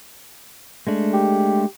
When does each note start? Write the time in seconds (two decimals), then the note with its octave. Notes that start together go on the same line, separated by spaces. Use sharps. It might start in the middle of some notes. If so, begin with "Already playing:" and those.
0.87 G#3 A3 D4
1.13 G4